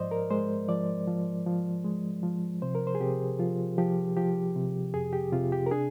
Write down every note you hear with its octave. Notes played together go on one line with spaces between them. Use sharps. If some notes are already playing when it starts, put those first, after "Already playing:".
Already playing: G#2 F3 C5 D5 D#5
A#4
G#3 C5
F3 D5
F3
F3
G#3
F3
C3 C5
A#4
C5
G#4
C3 G4
F3 F4
F3 G4
F3 G4
C3
F2 G#4
G4
C3 F4
G4
A#4
D4 G#4